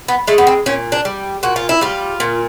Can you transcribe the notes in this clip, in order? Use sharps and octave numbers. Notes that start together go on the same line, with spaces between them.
B3
G#3 A3
B3
C4
A#2 C#4
D4
G3
A#2 F#4
F4
E4
G3 F4
A#2